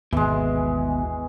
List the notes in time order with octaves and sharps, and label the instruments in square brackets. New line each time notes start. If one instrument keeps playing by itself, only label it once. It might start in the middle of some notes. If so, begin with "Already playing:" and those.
[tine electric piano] G#1 [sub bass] D#2 [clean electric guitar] B2 [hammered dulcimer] E3 G#3